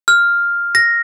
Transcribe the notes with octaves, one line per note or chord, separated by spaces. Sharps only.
F6
A#6